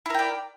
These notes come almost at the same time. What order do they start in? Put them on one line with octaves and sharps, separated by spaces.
E4 A#4 G5 D5